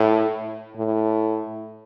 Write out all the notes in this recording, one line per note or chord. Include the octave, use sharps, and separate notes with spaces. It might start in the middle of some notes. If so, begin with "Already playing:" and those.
Already playing: A2
A2